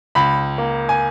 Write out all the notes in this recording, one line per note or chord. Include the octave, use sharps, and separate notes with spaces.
C#2 B5
A#3
G#5